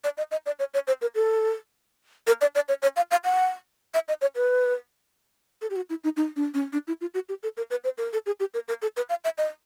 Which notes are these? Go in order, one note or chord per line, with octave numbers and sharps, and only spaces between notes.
D5
D#5
D#5
D5
C#5
C#5
C5
A#4
A4
A#4
D5
D5
C#5
C#5
F5
F5
F#5
E5
D#5
C#5
B4
A4
G4
F#4
E4
D#4
D#4
D4
C#4
D4
E4
F4
F#4
G4
A4
A#4
B4
C5
A#4
A4
G#4
G4
A#4
A#4
A4
B4
F5
E5
D#5